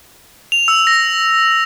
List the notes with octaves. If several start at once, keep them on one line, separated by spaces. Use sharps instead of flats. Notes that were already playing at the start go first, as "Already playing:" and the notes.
F7
E6
A#6